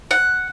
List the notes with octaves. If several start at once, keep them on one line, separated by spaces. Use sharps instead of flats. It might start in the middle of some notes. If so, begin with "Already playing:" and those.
F#5